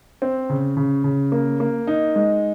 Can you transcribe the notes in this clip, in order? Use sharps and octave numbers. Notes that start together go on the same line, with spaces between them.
C4
C#3
C#3
C#3
A#3
A#3
D#4
G#3